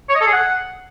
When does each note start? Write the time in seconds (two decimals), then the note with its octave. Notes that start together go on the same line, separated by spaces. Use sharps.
0.09 C#5
0.15 D#5
0.21 A4
0.27 G#4
0.33 F#5